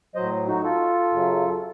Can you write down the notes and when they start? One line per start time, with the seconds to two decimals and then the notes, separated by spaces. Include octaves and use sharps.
0.15 A2 F#3 C5 D#5
0.47 D#4 F#4
0.63 F4 A4
1.12 F#2 C#3 F#3